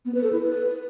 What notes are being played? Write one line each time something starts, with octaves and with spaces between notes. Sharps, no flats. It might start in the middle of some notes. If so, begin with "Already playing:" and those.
B3
B4
A4
E4
B4